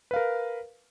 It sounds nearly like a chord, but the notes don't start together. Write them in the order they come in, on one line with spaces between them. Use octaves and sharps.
B4 F5 A#4